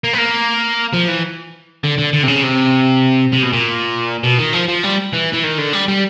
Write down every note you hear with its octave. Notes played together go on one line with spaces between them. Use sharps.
A#3
B3
A#3
F3
E3
D3
D3
D3
C3
C#3
C3
C3
B2
A#2
B2
D#3
F3
F3
G3
E3
E3
D#3
D3
G3
G3